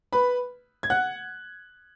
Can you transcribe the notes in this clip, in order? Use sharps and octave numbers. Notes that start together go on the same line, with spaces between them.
B4 B5
G#6
F#5 F#6